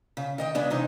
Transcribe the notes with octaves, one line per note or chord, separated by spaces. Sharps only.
C#3
D#3 D#5 G5
C#3 G#3 B3 D4
C3 E3 D#4